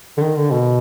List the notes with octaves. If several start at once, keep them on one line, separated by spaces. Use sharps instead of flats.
D3
D#3
D3
B2